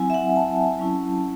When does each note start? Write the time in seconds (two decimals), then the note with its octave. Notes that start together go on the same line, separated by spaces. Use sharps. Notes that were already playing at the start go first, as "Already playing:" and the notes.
Already playing: F#3 C4 E4 G#5
0.10 E5
0.14 F#5
0.36 A5
0.79 F#3 C#4 E4